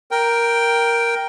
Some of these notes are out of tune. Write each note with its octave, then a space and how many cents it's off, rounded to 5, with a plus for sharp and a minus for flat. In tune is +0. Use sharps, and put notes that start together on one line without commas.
A#4 +5 G5 +0